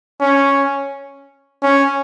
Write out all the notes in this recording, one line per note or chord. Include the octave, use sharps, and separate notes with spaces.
C#4
C#4